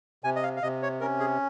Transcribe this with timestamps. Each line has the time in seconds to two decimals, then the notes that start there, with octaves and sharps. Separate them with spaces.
0.24 C3 G#5
0.36 D#5
0.43 F5
0.57 F5
0.62 C3 D#5
0.83 C#5
1.01 C#4 A#4
1.20 G#4